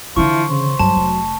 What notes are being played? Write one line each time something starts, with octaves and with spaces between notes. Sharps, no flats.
D3 E3 F3 E4 C#6
C#3 C5
G2 F#3 A5
F1